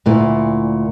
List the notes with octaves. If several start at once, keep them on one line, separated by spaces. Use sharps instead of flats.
D2 A#2 E4